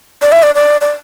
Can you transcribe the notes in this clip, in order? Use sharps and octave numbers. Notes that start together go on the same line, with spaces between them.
D5
E5
D5
D5
D5